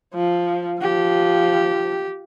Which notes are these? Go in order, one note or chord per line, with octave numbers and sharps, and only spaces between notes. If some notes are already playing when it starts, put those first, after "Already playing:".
F3
F3 G4